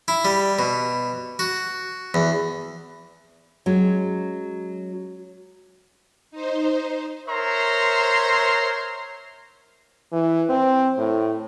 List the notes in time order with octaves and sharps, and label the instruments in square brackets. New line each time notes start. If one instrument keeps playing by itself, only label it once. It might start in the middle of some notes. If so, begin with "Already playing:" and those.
[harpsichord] E4
G3
B2
F#4
E2
[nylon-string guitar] F#3 G#3 C#4
[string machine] D#4 C5
[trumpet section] A#4 C5 C#5 E5 A#5 C6
[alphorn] E3
C4
A2